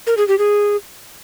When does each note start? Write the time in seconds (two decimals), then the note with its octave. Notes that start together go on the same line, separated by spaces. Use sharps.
0.07 A#4
0.17 G#4
0.28 G4
0.38 G#4